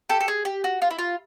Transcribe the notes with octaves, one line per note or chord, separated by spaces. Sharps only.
G4 A4
A4
G#4
G4
F#4
F4
E4
F4